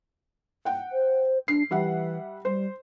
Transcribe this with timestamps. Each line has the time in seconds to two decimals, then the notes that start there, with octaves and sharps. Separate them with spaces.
0.65 F#5 G5
0.92 C5
1.48 D4 C7
1.71 E3 G3 E5 F#5
2.45 G3 C5